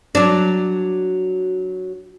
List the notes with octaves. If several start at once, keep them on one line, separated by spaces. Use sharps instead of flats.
F#3 D4